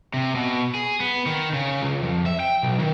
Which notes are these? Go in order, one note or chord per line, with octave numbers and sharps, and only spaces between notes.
C3
B2
G#4
B3
D#3
C#3
C#2
F2
E5
G5
B1
D#3